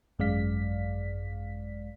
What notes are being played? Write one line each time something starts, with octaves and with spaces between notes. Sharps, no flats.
G#1 F#2 G#3 D5 F5 B6